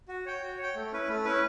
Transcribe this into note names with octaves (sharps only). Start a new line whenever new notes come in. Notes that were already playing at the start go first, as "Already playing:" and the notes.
F#4
C#5 G5
F#4
C#5 G5
A3
C#4 E4 B4
A3
C#4 E4 B4